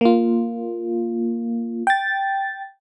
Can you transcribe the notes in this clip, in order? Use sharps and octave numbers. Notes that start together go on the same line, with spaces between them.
A#3 F4
G5 A6